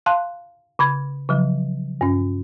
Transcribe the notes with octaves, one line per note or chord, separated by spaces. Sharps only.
F5 A5 C6 F#6
C#3 B5 G#6
C#3 F3 F#3
G2 C#4